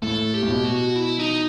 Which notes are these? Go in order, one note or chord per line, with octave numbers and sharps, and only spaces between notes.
A2 A4
G4
A2
B2
F#4
E4
D#4